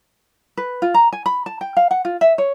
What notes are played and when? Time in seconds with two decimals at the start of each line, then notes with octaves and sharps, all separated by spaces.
0.57 B4
0.82 F4
0.94 A#5
1.13 G#5
1.26 B5
1.46 A5
1.61 G5
1.77 F5
1.91 F#5
2.05 F4
2.21 E5
2.38 C#5